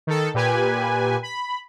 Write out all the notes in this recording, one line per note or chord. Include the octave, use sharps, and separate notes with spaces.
D#3 A4
A#2 G4 B4 G#5
B5